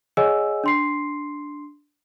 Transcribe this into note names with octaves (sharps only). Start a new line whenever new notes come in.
G#4 C#5 D#5 F#5 G#5 E6
D4 C6 C7